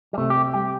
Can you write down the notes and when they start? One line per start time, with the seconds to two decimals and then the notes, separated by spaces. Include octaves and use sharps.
0.13 G3
0.18 C3 A3
0.30 G4
0.35 C4
0.54 G3 G4